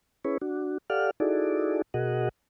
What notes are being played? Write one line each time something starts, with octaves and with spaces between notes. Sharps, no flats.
C#4 E4 G#4 B4 C#5
D4 F#4
G4 A4 D5 F5 F#5 F6
D#4 E4 F#4 G#4 A4 D5
B2 F#4 G#4 A#4 D#5 F#5